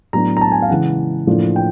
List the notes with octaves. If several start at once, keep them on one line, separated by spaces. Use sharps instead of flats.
A2 F#3 B3 D4 A#5
A#5
A5
G#5
F5
C#3 E3 G#3 F#5
A2 F3 A#3 D4
G5